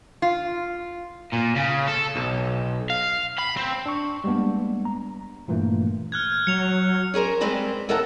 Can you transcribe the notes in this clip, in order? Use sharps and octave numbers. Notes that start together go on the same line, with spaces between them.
F4
A#2
C#3
A4
B1
F5
B5
C4
D4 C#6
G3 G#3 A#3 B3 D4
A#5
G2 A#2 E3 A3 A#3
F6 F#6 G#6
F#3 C#7 F7
C#4 G#4 A#4 C5
G3 G#3 C4 B4 C5
D#2 A4 A#4 E5 F#5 A5